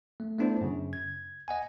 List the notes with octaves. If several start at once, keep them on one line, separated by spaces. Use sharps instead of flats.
A3
A3 B3 D4 E4 C5
F#2 C#3
G#6
D#5 F#5 G#5